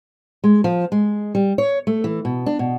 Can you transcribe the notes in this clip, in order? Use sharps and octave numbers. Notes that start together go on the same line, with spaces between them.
G#3
F3
G#3
G3
C#5
A3
E3
B2
D4
B2